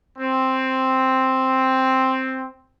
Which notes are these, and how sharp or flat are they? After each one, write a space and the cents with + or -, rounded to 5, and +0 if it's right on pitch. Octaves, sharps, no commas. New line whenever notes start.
C4 +5